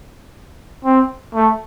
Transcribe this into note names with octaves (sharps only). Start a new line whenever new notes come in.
C4
A3